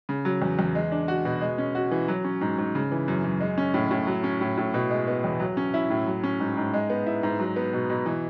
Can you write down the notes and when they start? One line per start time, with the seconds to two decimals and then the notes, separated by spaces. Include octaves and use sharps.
0.09 C#3
0.25 F#3
0.42 E2
0.59 E2
0.75 G#3
0.92 D4
1.08 F#4
1.25 B2
1.41 G#3
1.58 C#4
1.75 F#4
1.91 E3
2.08 F#3
2.25 C#4
2.41 G#2
2.58 G#2
2.75 C#3
2.92 E3
3.08 F#2
3.24 F#2
3.41 G#3
3.58 C#4
3.74 A2
3.91 A2
4.07 F#3
4.24 C#4
4.41 A2
4.57 A2
4.74 B2
4.91 G#3
5.07 B3
5.24 E2
5.40 F#3
5.57 C#4
5.74 E4
5.90 A2
6.07 F#3
6.24 C#4
6.40 G#2
6.57 G#2
6.74 G#3
6.90 B3
7.06 E4
7.23 G#2
7.40 F#3
7.56 B3
7.73 B2
7.90 B2
8.06 E3